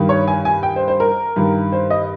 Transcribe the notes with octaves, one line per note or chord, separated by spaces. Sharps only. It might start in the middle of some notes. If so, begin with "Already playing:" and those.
Already playing: G2 D#3
C#5
G#5
G#5
G5
C5
C5
A#4
G2 D#3
C5
D#5